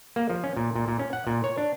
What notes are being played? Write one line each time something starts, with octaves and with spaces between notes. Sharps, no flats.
A#3
F3
C#4
A#2
A#2
A#2
C#4
F#5
A#2
C#5
D4